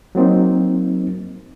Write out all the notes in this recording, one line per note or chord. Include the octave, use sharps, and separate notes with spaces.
F#3 A#3 C4 D#4